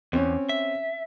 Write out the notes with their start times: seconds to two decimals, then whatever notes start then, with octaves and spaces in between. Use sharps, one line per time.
0.13 E2 C4 C#4
0.49 E5